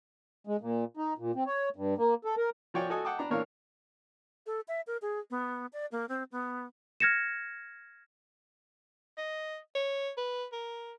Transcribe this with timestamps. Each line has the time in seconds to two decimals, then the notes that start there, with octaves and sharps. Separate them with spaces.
0.47 G#3
0.61 A#2
0.97 D#4
1.18 A#2
1.35 C4
1.47 C#5
1.76 G2
1.98 A#3
2.25 A4
2.37 A#4
2.74 F3 F#4 C#5 D5 G5 G#5
2.90 F#4 A4 D#5 G#5 D#6
3.05 F#5 G5 A5 D6 D#6
3.18 D4 A#5 B5
3.30 A#2 E3 D4 A#4 C#5 F5
4.46 A4
4.68 E5
4.87 A#4
5.02 G#4
5.30 B3
5.73 D5
5.92 A#3
6.09 C4
6.32 B3
7.00 F6 G#6 A#6 C#7 E7
9.18 D#5
9.75 C#5
10.17 B4
10.52 A#4